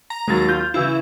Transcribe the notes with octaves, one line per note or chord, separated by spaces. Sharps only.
A#5
D#2 F#3 G#3 A#3 A6
F4 G6
C#3 E3 E4 F5